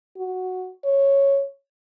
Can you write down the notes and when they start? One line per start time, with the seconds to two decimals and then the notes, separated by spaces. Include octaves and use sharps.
0.17 F#4
0.85 C#5